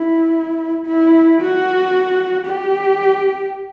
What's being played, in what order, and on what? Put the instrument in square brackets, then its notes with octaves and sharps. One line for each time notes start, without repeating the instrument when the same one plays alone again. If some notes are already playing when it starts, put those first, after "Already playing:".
Already playing: [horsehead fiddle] E4
E4
F#4
G4